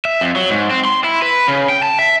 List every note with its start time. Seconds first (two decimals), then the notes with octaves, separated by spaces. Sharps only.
0.05 E5
0.21 F2
0.36 F#3
0.50 G#2
0.71 C4
0.85 C6
1.04 E4
1.22 B4
1.48 C#3
1.69 G5
1.83 A5
1.99 E5